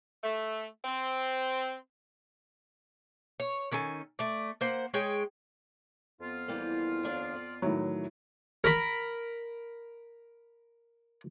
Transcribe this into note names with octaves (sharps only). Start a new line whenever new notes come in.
A3
C4
C#5
D#3 C#4 A4 G#5
A3 D5
A#3 C5 F#5
G#3 G#4 C#5 G5
F2 B3 F4
E3 G3 A#3
D#2 D4 F5
D5
A2 D#3 E3 F#3
A#4 B5